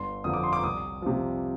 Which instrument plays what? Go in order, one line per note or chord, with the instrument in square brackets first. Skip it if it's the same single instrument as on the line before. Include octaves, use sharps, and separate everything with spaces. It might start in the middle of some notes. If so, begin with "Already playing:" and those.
Already playing: [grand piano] G1 C6
F2 D3 F3 D#6
D6
C6
D6
C2 D#6
C3 F3